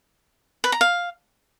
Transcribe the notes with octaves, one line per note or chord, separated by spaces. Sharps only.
B4
A#5
F5